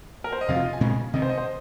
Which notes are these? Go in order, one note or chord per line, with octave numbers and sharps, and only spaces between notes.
A#4
C5
D#5
F2 C3 F3 F5
F4
D#5
G#5
A#2 G#3 C4
C3 D#3 C4 D#5
C5
D#5
C5